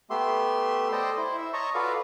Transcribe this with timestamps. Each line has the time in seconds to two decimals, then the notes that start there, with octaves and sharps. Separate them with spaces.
0.10 A3 B3 G4 E5 C6
0.92 A4 C5 D5 D#5 G5 A5
1.18 E4 C5
1.38 E5
1.53 C#5 D#5 A5 A#5 C#6
1.75 F4 F#4 A4 B4 D5 F5